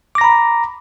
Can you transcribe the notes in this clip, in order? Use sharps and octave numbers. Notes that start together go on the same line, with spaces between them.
A#5 B5 D6 A#6